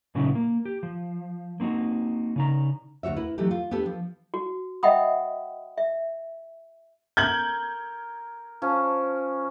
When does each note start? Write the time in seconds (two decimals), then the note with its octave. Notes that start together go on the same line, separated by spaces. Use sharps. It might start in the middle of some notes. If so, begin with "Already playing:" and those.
0.15 A#2 C#3 F#3 C#4 D#4 E4
0.35 A#3
0.65 G4
0.83 F3
1.60 A#3 C4 D#4 F#4
2.36 C#3 D#4 A#5
3.03 D2 F#4 C#5 E5
3.16 E4 A#4 B4
3.38 E3 F#3 A3 D#4 G4
3.51 F4
3.71 B3 D4 G4 A4
3.86 F3
4.34 F#4
4.83 D#5 E5 F#5 G5 B5 D#6
5.77 E5
7.17 A#4 G6 G#6 F#7
8.62 F3 C#4